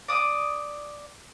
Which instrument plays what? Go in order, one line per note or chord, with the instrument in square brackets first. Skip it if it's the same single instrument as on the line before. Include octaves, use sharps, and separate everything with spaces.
[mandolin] D5 D#6